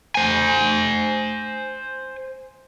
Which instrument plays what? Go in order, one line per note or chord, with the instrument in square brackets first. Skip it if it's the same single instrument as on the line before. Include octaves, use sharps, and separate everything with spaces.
[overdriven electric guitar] C5 G#5